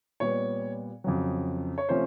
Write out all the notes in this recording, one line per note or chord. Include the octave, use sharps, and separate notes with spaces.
A#2 G3 B3 C#5
F2 C#3 F#3
C#5
C3 F3 A3 C#4 C5